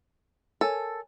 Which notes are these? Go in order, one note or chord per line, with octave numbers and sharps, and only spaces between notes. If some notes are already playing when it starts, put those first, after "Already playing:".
A4 A#4 C#5 G#5